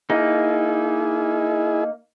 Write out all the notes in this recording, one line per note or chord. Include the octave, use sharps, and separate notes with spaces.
A#3 D#4 E4 G#4